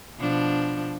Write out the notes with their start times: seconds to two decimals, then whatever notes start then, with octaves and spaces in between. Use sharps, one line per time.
0.18 B2 F3 D4